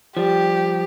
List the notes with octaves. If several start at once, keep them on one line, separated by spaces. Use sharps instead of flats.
F3 G3 G4